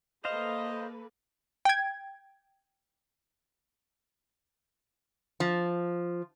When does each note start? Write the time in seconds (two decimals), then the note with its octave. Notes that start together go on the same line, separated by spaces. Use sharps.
0.25 A#3 A4 B4 C5 D#5 F5
1.65 G5 G#6
5.40 F3